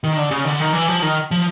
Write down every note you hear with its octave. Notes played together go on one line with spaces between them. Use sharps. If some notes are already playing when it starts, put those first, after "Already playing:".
D#3
D3
C#3
D3
D#3
E3
F3
D#3
F3